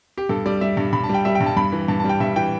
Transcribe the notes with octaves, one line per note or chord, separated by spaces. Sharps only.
G4
G2 A4
G3 D5
G3 E5
G2
G2 B5
A5
G3
G5
G3 E5
G5
G2
A5
G2 B5
E3
G2 A5
G3 A5
G5
G2 E5
E3 G5